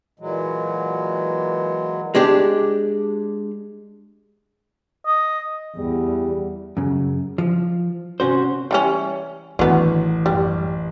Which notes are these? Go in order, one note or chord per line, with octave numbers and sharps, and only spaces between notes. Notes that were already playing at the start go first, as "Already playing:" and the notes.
A#2 E3 F#3 G#3
G#3 D4 G4
D#5
E2 G3
F#2 C#3
F3
C3 C#4 F#4 C5
E3 G3 C#4
A1 D3 D#3 F#3 B3
F#2 G3